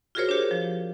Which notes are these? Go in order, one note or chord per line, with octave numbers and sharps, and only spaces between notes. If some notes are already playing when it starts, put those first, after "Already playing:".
F4 F#4 G#4 A#4 C5 C#5
D4 G4
F3